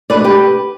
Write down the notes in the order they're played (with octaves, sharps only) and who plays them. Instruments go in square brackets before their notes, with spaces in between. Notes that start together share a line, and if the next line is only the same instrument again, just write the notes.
[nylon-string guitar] B2 A3 D4 B4 D5
G4 B4